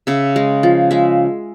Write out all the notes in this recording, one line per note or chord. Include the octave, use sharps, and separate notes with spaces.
C#3 E5
G#3
F3
G#3 E5